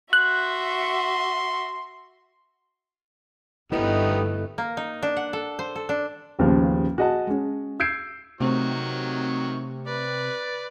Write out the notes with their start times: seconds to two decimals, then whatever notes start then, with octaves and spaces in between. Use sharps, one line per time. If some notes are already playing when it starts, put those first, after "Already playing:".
0.13 F#4 E5 C6 F#6
3.72 G1 A3 B3 D#4 E4 G4 B4 D#5
4.58 A#3
4.77 D#4
5.03 D4
5.17 F#5
5.33 A4
5.59 C5
5.75 A4
5.89 D4
6.39 A1 D#2 C#3 F3 B3 F6
6.98 F#4 G#4 D#5 F#5 A5
7.27 G#3 C#4
7.80 E6 G6 G#6 C7 D7
8.41 C3 D#3 F#3 A3 C4 C#6
9.87 B4 D5